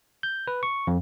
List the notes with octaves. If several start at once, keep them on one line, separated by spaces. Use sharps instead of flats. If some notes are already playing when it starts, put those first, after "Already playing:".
G6
B4
C#6
F2